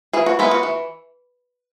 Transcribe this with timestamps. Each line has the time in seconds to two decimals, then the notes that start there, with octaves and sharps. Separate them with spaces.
0.13 E3 G#4
0.26 F#4
0.39 G#3 B3 E4
0.51 F#4
0.63 E3